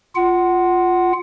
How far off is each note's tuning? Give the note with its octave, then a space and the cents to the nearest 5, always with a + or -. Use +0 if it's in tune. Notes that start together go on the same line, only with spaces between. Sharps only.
F4 +0 F#5 +15